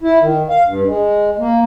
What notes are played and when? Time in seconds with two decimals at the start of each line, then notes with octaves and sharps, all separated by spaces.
0.01 E4
0.22 D#3
0.50 F5
0.67 G2
0.86 G#3
1.39 A#3